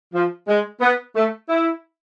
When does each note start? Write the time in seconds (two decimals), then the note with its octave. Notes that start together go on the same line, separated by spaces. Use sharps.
0.14 F3
0.48 G#3
0.81 B3
1.15 A3
1.49 E4